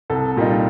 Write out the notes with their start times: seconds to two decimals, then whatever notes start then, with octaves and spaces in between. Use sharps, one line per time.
0.10 C2 A4
0.36 A#2 G3 A#3 D#4